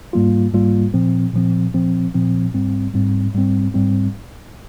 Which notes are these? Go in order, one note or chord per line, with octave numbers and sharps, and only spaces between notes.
G#2 G3 A#3 F4
G#2 G3 A#3 F4
A#2 F3 C4
A#2 F3 C4
A#2 F3 C4
A#2 F3 C4
G#2 G3 C4
G#2 G3 C4
G#2 G3 C4
G#2 G3 C4